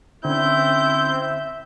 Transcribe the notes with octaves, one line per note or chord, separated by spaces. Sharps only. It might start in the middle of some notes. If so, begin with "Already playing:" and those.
D3 C4 C#4 E4 G6
E5